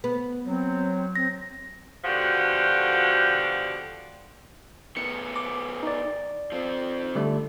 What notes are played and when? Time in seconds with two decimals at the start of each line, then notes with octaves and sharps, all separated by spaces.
0.04 B3
0.46 F#3 C4
1.16 C4 A#6
2.05 B2 D3 F3 F#4 G4
4.97 D#3 B3 C#7
5.36 D6
5.83 D#4 D5
6.52 F3 C4
7.15 D3 G3 A3